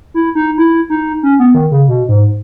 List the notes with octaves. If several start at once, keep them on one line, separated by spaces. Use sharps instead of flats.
E4
D#4
E4
D#4
C#4
B3
D#3
C#3
B2
G#2